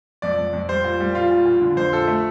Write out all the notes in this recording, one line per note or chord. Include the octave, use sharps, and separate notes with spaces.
F2 D5
F2
F2
G3 C5
A#2
G3
A#2 F4
A#2
A#2
D3
F2 C5
F3 A4
A3